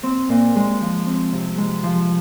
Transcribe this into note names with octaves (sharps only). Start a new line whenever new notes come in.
C4
A#2
G#3
F3
C4
C3
G#3
F3